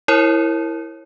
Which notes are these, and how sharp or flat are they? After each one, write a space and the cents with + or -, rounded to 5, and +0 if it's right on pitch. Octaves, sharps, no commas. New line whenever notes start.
E4 +0 A#4 +0 C#5 -30